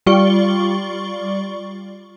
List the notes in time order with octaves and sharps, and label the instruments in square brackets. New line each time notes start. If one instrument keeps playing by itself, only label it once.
[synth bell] G3 F4 D5 C#6 G7